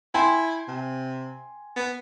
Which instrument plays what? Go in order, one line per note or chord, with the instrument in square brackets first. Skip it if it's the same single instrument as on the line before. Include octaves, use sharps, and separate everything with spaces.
[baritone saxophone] E4 [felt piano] G5 G#5 C6
[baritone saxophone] C3
B3